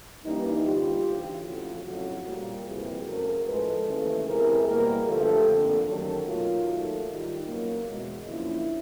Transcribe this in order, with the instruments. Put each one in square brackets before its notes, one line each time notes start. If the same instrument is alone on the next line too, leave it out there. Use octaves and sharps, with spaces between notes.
[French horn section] G2 E3 G3 A#3 C#4 D#4
D2 D3 G3 F4 G4
D2 C#3 E3
F2 C#3 F3 A3 E4 F#4
F2 C#3 F#3 A3 E4 F#4
A#2 G3 A#3
F2 C3 E3 G3 A#3 F#4 G#4
F#2 C#3 F#3 A3 G#4 A#4
A2 F3 G#3 A4 B4
D#2 C#3 E3 A3
E2 C3 E3 G#3 G#4 A#4
E2 B2 G3 A#3 G#4 A#4
G2 D3 F3 A3 G4 A4
F2 D3 F3 A#3
F#2 D#3 F#3 A3 G4 A4
B2 F#3 A#3 D#4 F4
D#2 D#3 F#3 A3
G#2 D#3 G3 D#4 F4
E2 C#3 F#3 A#3
E2 B2 G#3
F#2 C#3 F3 A#3 D4 E4